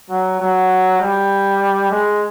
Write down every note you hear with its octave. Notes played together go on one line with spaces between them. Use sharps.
F#3
F#3
G3
G#3